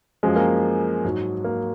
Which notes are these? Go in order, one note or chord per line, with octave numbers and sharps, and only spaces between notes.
F#2 F3 G#3
A#3
G#2 F#3
A#3